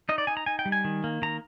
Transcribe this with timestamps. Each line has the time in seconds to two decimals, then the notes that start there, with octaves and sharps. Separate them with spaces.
0.09 D#4 D#5
0.18 D5
0.27 D#4 G#5
0.37 A#5
0.46 D#4 G#5
0.59 G5
0.66 G3
0.72 G#5
0.84 D#3
1.04 A#3
1.22 D#3 A#5